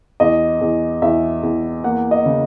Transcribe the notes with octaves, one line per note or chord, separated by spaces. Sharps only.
E2 D#5
E2
E2 E5
E2
A#3 F#5
D#5
C#3